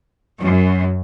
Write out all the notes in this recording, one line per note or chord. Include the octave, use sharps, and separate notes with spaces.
F#2